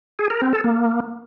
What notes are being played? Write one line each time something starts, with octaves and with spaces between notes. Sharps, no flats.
G#4
A#4
C4
A4
A#3